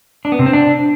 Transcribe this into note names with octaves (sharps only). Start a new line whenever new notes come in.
D4
B3
C3
C4
D4